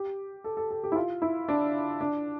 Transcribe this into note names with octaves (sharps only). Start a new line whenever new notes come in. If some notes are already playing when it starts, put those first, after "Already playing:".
Already playing: G4
A4
A4
A4
G4
E4
F4
E4
D4
D4